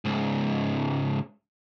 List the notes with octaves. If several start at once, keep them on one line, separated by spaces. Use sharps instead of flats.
C#2 G#2